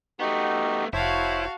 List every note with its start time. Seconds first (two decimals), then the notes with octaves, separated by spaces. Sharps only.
0.20 A3 B3 D#4 F#4 G4
0.93 F1 E4 F#4 C5 C#5 F5 A5